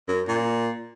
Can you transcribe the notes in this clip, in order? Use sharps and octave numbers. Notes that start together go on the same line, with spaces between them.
F#2
A#2